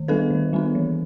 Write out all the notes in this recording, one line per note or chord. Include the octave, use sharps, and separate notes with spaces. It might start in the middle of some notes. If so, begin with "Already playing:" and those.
Already playing: D#3
G3 B3 D4 A4 B4
D#3
G3 B3 D4
E3